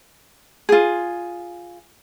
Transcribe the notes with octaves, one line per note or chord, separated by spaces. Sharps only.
F4 G#4